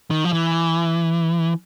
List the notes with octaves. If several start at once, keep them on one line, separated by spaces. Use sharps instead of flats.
D#3
F3
E3